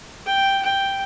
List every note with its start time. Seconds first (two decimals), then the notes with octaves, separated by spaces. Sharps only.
0.26 G5
0.62 G5